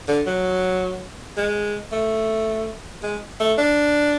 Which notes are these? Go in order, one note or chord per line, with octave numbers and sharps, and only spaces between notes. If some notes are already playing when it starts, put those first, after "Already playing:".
D3
F#3
G#3
A3
G#3
A3
D4